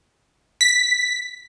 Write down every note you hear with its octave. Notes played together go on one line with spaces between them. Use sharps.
B6